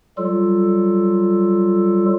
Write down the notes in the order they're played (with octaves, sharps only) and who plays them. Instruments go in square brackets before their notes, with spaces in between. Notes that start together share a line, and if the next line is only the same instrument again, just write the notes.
[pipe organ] F#3 G3 F4 A4